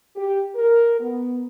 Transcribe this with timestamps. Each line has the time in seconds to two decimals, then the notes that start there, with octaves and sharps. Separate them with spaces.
0.16 G4
0.55 A#4
0.99 B3